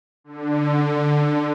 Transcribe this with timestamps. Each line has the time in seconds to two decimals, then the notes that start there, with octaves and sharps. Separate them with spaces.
0.24 D3